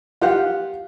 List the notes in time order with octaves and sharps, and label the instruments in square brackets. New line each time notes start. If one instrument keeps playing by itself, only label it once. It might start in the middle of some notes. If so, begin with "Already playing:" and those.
[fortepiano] F4 G4 F#5